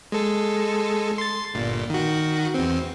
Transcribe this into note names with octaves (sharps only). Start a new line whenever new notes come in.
G#3 A4
C6 A6
G1 A#2
D#3 F#4
E2 C4